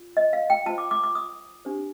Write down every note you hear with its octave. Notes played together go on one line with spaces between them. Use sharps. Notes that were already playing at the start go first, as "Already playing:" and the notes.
Already playing: F4
D#5
F5
G5
F4 C5 A5
D6
D6
D6
D#6
D4 G4 C5